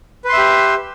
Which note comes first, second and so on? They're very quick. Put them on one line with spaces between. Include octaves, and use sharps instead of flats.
B4 C6 E5 G4